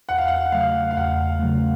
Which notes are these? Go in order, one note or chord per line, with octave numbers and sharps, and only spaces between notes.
E2 F#5
F5
F#5
C#3 F#3 A3 F5
F5
E2 F#5
C#3 F#3 A3